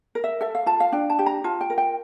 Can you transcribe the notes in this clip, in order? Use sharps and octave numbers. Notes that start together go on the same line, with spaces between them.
A#4
E5
A4 E5
F5
F4 A5
F5
D4 G5
A5
G4
A#5
F4 A5
G5
A#4
G5